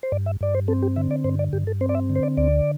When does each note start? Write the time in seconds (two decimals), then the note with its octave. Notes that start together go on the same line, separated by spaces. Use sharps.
0.03 C5
0.12 G2 D5
0.26 E5
0.41 G2 D5
0.55 C5
0.68 C4 A4
0.82 G4
0.96 D3 E5
1.11 D5
1.24 G2 C5
1.39 D5
1.53 G2 G4
1.67 A4
1.81 C4 C5
1.89 D5
1.95 E5
2.10 D3
2.16 C5
2.23 D5
2.37 D2 D5